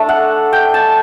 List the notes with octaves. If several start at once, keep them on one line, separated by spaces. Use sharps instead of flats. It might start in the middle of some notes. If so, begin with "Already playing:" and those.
Already playing: A3 D4 A4
F#5
G5
A5